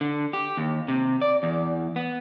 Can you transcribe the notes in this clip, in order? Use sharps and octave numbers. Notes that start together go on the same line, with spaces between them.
D3
G4
D#2
C3
D5
E2
B3